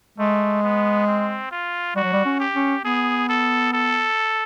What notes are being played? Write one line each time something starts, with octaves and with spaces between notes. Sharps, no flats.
G#3 A3
B3
C4
F4
G3 F#4
F#3
G3
C#4
G4
C#4
B3 G#4
A4
A4